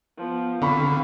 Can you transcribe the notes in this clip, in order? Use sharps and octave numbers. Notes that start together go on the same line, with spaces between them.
F3 B3
D3 C4 F5 B5 C#6